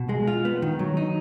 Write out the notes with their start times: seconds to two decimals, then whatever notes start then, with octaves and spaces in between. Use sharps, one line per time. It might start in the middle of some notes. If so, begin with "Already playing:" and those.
Already playing: B2
0.09 G#3
0.27 F4
0.45 B3
0.62 D#3
0.79 F#3
0.97 D#4